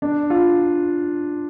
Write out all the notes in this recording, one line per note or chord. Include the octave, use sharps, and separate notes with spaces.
D4
F4